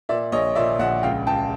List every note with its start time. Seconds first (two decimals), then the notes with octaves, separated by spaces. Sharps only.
0.09 A#2 D5 E5
0.32 A#1 C#5 D#5
0.55 A#2 D5 E5
0.79 A#1 E5 F#5
1.03 C#2 F5 G5
1.27 C#2 G5 A5